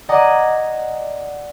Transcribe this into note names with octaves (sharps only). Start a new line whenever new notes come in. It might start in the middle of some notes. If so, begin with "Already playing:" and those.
D5 D#5 F#5 G#5 A#5 D#6